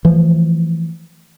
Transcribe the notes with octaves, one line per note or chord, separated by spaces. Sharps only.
E3 F3 A3